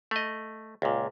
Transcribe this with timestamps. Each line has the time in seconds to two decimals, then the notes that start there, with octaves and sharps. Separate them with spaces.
0.11 A3 D#5
0.82 C#2 A#2